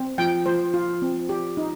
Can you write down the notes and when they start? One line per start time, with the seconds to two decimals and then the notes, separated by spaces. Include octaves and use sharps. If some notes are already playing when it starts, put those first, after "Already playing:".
Already playing: C4
0.18 F3 G5
0.46 F3 C5
0.74 F4
1.02 C4
1.29 G4
1.57 D#4